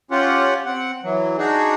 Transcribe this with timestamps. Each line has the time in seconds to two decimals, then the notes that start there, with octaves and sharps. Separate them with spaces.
0.11 C#4 F4 G4 F#5
0.66 C4 F#5
1.04 E3 F#3
1.38 D4 D#4 F#4 G#4